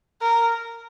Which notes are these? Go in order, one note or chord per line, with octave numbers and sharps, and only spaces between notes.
A#4